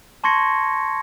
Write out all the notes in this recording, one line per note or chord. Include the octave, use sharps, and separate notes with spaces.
A5 C6 C#6 G#6 A#6 C#7